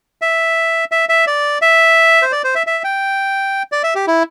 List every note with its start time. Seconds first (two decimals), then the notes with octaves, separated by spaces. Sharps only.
0.22 E5
0.92 E5
1.09 E5
1.27 D5
1.62 E5
2.22 C5
2.32 D5
2.44 C5
2.55 E5
2.67 E5
2.84 G5
3.72 D5
3.83 E5
3.95 G4
4.07 E4